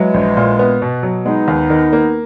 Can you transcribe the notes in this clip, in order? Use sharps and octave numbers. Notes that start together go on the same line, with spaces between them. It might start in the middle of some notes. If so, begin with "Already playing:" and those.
Already playing: E3 F#3 G#3
A#1
A#2
B3
B2
F#3
G#3 B3 D#4
D#2
D#3
A#3